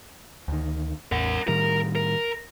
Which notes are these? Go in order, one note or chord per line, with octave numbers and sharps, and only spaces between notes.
D2 D#3
A1 E2 A#4 F#5
A2 D#3 G3 A#4
A#4